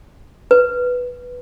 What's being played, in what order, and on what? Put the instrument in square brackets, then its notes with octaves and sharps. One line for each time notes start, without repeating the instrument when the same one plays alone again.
[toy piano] B4